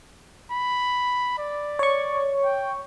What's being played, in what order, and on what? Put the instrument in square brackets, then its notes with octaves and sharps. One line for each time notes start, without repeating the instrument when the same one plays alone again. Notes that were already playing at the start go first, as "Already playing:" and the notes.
[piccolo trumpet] B5
D5
[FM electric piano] C#5 C#6
[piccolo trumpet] G5